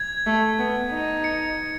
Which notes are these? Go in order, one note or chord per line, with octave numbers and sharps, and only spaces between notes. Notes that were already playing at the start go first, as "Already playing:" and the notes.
Already playing: G#6
A3
B3
D#4
C#7